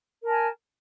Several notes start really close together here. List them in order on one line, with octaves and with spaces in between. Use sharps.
A#4 A5 G#5